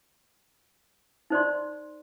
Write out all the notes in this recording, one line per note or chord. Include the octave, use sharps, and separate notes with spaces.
D#4 C5 D5 C6